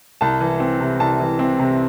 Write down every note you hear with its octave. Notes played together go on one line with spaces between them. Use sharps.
C2 A5
E3
C4
C3
C2 A5
E3
C4
C3